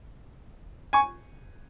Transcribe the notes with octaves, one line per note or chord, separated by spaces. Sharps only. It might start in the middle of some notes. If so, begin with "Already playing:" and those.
G#5 C#6